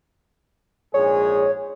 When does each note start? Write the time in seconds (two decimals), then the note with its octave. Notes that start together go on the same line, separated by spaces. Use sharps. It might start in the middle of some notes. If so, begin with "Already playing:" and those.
0.94 A#1 G#2 G#4 C#5